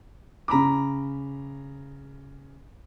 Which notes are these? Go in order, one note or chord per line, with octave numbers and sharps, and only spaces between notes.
C#3 A#5 B5 D6